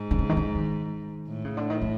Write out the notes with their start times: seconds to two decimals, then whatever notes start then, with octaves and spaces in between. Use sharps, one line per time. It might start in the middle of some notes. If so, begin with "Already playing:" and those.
Already playing: G#2
0.11 D3
0.19 C#3
0.29 D#3
0.37 D3
0.55 D#3
1.27 A2
1.44 C#3
1.57 D3
1.70 D#3
1.82 E3